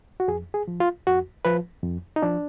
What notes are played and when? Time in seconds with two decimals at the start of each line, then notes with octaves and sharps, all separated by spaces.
0.20 F#4
0.28 F2 G#4
0.54 G#4
0.68 F3
0.80 F4
1.07 F2 F#4
1.45 F3 B4
1.83 F2
2.16 D#4
2.22 F3 D4